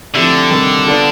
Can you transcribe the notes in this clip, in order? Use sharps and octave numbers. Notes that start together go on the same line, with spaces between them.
D3 F3 A3 C4 E4 G4
C3 D#3 G3
B3 D4 F4 A4